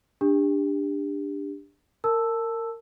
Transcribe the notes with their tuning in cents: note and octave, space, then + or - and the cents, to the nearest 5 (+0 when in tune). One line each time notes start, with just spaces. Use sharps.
D4 +0 G4 +25
A#4 -25 A5 +0 E6 +0